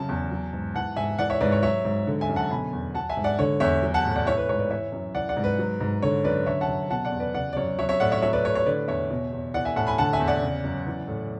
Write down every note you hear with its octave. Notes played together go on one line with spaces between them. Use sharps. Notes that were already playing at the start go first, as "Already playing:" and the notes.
Already playing: F#2 C#3 A5
E2
F#3
G#2
E3 F#5 A5
G#2 E5 G#5
E3 D5 F#5
C#5 E5
G#2 B4 D5
C#5
F#3 C#5 E5
G#2
D3
E5 G#5
F#2
F#5 A5
B2 G#5 B5
E2
F#3 F#5 A5
E5 G#5
G#2
D5 F#5
D3 C#5
E2 C#5 E5
F#3
F#5 A5
A2
D5 F#5
E3 C#5 E5
B4
G#2 C#5
B4 D5
E3 C#5 E5
F#2
E3 D5 F#5
D5 F#5
G#2
B4
F#3
G#2
D3 C#5
F#2 B4 D5
D3 C#5 E5
F#5 A5
F#2
B2 F#5 A5
D5 F#5
E2
B4 D5
C#3 D5 F#5
D5
F#2 C#5
F#3 C#5 E5
C#5 E5
A2 D5 F#5
C#5 E5
F#3 C#5 E5
B4 D5
A2 C#5
C#5
D3 B4 D5
E2 C#5 E5
B2
E2
E3 D5 F#5
E5 G#5
A2 F#5 A5
G#5 B5
D3 F#5 A5
E5 G#5
E2
D5 F#5
C#3
F#2
E3
A2